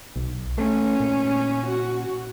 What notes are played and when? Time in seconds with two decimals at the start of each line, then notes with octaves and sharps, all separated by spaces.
0.16 B1
0.58 A3 C#4
1.00 A#2
1.67 F#4